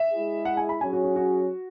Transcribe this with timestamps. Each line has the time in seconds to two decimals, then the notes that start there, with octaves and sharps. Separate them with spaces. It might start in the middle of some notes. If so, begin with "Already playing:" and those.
Already playing: E5
0.11 G#3 E4 G#4
0.45 F#5
0.57 G#5
0.69 B5
0.81 F#3 C#4 G#4 G#5
0.93 F#4
1.04 F#4
1.16 F#4